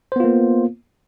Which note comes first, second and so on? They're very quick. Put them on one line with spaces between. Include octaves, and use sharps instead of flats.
C5 B3 F4 A#3